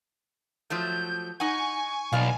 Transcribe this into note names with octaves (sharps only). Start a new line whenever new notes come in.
F3 F#3 A3 G6
D#4 F#5 G#5 C#6
B1 D5 F5